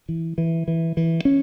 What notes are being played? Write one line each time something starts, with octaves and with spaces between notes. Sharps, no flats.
E3
E3
E3
E3
C#4